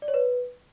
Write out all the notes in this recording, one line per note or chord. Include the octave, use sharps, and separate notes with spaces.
D5
C#5
B4